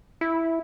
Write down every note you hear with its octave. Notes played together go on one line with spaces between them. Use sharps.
E4